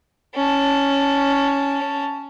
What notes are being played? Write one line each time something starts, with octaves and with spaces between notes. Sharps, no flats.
C#4 A5